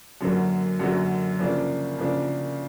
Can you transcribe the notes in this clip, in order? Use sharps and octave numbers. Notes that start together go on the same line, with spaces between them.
F#2 D3 F#3 A#3
F#2 D3 F#3 A#3
C#3 F3 A#3 D4
C#3 F3 A#3 D4